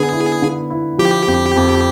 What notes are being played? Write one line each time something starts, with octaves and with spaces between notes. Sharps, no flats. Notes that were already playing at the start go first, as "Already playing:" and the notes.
Already playing: D3 B3 G#4
E4
D3
E4
F3 G4
F2
F2